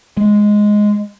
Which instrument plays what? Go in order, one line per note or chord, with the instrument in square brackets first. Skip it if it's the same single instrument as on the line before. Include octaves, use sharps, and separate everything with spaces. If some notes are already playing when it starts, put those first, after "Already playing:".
[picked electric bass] G#3